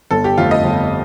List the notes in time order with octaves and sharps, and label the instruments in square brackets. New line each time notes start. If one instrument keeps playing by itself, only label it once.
[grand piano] G1 [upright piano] A4
[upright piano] G4
[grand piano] F2 D3 A3 [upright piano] F4
[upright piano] D#5
[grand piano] G1